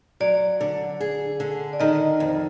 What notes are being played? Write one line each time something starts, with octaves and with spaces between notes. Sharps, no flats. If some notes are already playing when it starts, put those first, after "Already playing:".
F#3 D5
D3
G#4
D3
D5
D#3 D#5
F2